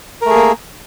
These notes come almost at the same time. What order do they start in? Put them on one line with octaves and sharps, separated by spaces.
A#4 A3 G#4 A#3